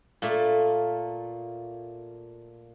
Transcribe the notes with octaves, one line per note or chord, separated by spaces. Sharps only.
A#2 A3 A#3